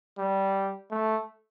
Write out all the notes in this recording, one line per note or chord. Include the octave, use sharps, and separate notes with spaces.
G3
A3